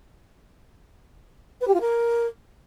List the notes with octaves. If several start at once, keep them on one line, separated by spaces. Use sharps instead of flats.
B4
G4
F4
A#4